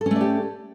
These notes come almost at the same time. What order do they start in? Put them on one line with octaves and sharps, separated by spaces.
A4 C#4 A3 D5 G4